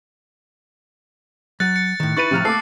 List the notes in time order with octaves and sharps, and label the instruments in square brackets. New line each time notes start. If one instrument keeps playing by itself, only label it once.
[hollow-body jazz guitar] F#3 [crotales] F#6 A6 C#7
[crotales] C#7
[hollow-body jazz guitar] A2 D#3
[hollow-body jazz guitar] D#4 E4 B4 [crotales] C#6 F#7 [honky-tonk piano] A6 D#7
[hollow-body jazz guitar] A2 F3 A#5 [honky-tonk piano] C3 F6
[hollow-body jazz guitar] A3 A#3 [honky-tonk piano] A4 D6 [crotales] D#6 C7